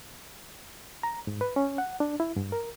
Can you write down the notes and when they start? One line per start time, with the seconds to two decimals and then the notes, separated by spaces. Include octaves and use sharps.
1.03 A#5
1.27 G#2
1.41 B4
1.56 C#4
1.78 F#5
2.00 D4
2.20 E4
2.36 G2
2.52 A#4